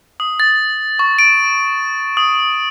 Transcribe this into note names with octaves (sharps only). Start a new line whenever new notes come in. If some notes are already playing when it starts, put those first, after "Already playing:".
D#6
A6
C#6
D7
D#6